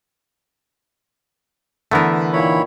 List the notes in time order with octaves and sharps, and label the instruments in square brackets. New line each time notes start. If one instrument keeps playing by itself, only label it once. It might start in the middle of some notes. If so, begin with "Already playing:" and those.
[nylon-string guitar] D3 E3 [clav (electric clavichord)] A3 B3 A#4
[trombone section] A#2 D#3 [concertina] E4 C#5 B5